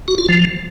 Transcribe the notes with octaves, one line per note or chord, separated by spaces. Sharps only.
F#4
F4
F3